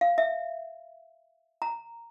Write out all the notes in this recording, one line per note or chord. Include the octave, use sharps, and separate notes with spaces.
F5
E5
A#5